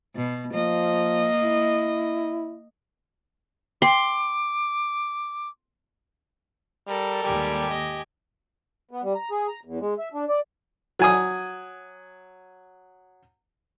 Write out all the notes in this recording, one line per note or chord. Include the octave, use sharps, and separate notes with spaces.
B2
F3 A#3 D#5
E4
G5 C6 D6
G3 A4 A#4
D#2 G#2 G3 G4 G#5
D#5
B3
G3
A#5
G#4
A#5
E2
G#3
E5
D4
D5
F#3 G#5 D#6